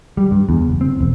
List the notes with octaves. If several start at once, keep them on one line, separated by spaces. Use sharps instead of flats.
G3
G2
E2
F#1
C4
E1